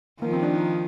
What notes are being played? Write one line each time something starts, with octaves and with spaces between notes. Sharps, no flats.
D#3 F3 A#3
C4
D4
D#4